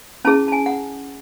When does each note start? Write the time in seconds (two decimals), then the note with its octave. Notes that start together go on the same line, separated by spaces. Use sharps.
0.25 C#4 E4 G#4 A5
0.48 A5
0.52 G#5
0.66 F#5